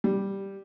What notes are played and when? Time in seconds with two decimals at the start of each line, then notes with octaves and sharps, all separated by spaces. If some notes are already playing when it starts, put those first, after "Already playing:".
0.04 G3